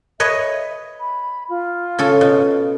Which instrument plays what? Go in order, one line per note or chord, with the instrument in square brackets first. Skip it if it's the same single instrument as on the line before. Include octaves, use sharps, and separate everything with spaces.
[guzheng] B4 C#5 D#5 [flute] E5
[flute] B5
F4
[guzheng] C#3 C#4 A4
B2